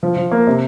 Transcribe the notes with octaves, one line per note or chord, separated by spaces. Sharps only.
F3
F3
A#3
C3